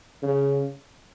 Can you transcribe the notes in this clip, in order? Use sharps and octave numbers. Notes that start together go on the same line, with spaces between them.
C#3